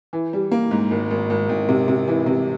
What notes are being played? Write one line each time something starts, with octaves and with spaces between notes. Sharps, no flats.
E3
G3
A#3
G#2
G#1
G#1
G#1
G#1
C3
C3
E3
C3